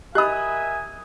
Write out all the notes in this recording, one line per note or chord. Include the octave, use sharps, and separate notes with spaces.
G4 A#4 D#5 E5 G#5 B5 D#6 F#6